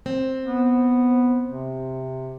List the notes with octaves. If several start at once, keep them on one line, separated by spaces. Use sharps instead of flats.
C4
B3
C3